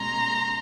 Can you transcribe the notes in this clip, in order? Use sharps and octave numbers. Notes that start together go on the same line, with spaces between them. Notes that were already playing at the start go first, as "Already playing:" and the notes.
Already playing: B2 G#3 C#4 A#5 C6